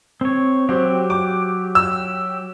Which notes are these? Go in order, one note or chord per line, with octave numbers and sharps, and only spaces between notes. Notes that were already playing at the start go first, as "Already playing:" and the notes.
C4 C#5
F#3 C4 G4
D6
E6